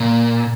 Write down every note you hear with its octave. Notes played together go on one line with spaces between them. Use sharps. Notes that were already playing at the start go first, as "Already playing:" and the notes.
Already playing: A#2